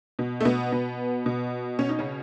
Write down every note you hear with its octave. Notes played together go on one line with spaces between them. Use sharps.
B2
A3
B2 B3
B2
B2
B2 C#4
D#4
C#3 C#4